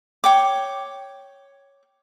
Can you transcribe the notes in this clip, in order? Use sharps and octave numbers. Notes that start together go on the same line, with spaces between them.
C#5 G5 D6